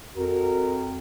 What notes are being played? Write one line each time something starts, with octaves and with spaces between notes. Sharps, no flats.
F2 F#4 A#4